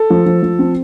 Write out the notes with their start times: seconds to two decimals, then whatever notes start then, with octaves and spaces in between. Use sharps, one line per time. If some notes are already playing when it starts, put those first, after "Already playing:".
Already playing: A4
0.10 F3
0.26 F3
0.43 F3
0.59 C4